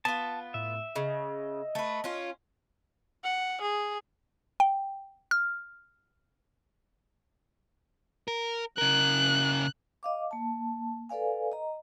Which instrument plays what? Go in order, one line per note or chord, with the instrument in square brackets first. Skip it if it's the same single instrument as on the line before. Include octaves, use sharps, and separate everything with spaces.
[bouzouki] B3 F4 [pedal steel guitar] A5
[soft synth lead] A2 [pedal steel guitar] E5
[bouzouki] C#3 [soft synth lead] D#5
[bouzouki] A3 B4
C#4 F4
[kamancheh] F#5
G#4
[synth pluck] G5
F6
[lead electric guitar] A#4
[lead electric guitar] C#3 A#4 [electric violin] F#6
[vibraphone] D#5 F5 D6
A#3 A5
A4 B4 D5 F5 G#5
D#5 A#5